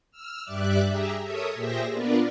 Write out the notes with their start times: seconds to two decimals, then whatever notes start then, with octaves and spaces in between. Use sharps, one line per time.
0.11 E6 F6
0.43 G2 G3 D5 E5 D6 F#6
0.87 G4 G#4 E5 A#5
1.21 A4 A#4 C#5 E5 D#6
1.55 A#2 G4 G#4 C5 E5 A#6
1.92 B3 D4 F4 A#4 B4 D5